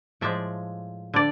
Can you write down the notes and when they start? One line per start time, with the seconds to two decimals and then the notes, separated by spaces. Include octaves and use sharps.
0.21 A2 F3 G#3 D5 E5
1.14 D3 D5